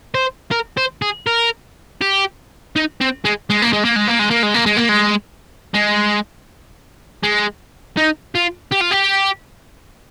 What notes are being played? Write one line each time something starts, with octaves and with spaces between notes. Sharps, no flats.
C5
A#4
C5
G#4
A#4
G4
D#4
C4
G#3
G#3
A#3
G#3
A#3
G#3
A#3
G#3
A#3
G#3
A#3
G#3
A#3
G#3
G#3
G#3
D#4
F4
G4
F4
G4